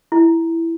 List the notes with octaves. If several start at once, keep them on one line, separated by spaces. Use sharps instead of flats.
E4